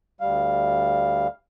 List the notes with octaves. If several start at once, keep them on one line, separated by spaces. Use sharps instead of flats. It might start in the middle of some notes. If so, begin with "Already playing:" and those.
D2 G3 F5